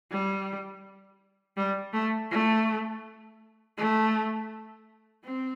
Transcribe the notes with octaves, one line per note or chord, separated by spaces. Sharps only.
G3
G3
A3
A3
A3
C4